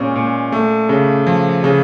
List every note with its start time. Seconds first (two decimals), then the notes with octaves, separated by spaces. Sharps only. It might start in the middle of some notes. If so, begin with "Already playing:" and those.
Already playing: A#2 G#3 C#4
0.16 A#2
0.52 A3
0.89 C#3
1.27 F3
1.64 C#3